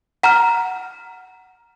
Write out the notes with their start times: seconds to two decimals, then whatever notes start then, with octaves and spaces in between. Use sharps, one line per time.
0.23 F#5 A#5 F6